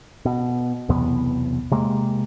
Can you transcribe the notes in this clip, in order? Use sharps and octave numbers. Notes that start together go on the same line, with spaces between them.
B2
B1 E2 C3 B3
C3 G#3 A#3